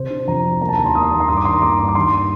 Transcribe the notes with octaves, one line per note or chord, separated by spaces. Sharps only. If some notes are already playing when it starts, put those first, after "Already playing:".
Already playing: C3 C5
D4
F2 A#5
D4
A#3 A#5
A5
D#2 A#5
C6
A#3 D#6
C6
D#2 A#5
C6
G2 D#6
D6
D#3 C6
A#5
A#3 D6
G2
D6
D#3 C6